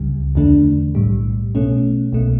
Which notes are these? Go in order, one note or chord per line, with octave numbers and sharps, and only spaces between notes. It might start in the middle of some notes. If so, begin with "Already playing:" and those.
Already playing: C#2 C#3 G3
E2 D3 A3 D4
B1 A2 G3
B2 A3 C#4
B1 B2 A3